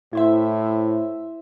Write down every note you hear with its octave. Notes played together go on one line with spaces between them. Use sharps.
A2 E4 C5 E5